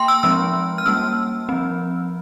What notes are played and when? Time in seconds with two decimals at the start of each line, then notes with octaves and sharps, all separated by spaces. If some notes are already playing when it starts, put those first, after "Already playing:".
Already playing: A#3 G5 C6
0.08 E6
0.23 F3 G#3 C4 E6
0.78 F6
0.86 G3 A#3 C#4 E6
1.49 F3 C4